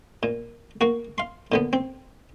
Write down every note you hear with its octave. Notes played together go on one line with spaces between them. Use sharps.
A#2
A#3 F#4
F5 C6
A#2 D3 B3
C4